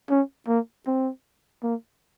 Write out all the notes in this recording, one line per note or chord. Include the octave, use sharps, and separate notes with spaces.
C#4
A#3
C4
A#3